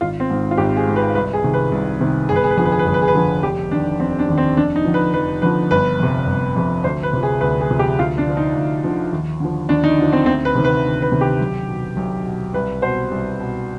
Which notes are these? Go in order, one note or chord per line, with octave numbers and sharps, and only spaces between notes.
G#1 F4
C4
G#2 D#3
F4
G#1 G4
G#4
G#2 D#3
B4
C2 B4
G#4
C3 D#3
B4
C2
C3 D#3
G1 G#4
B4
G#4
B4
F2 D3 F3 G#4
B4
G#4
B4
G1 G#4
B4
G#4
B4
F2 D3 F3 G#4
F1 G4
D#2 D#3 D4
F1 C4
D4
D#2 D#3
C4
F1 D4
D#4
F2 D3 F3
B4
F1 B4
F2 D3 F3 B4
G1 B4
F2 C3
G1
F2 C3
D2 C5
B4
C3 F3
G#4
D2 B4
G#4
C3 F3
G4
D2 F4
D4
D3 F3
D#4
D2
D3 F3
D#2
D3 F3
D#2 D4
D#4
D3 F3
C4
D2 C4
B4
C3 D#3
B4
D2
B4
C3 D#3
G4
B1
B2
B1
B2
C2 B4
B2 C5
C2
B2